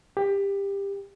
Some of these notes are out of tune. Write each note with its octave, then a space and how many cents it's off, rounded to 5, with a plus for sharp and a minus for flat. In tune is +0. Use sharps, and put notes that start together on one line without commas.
G4 +20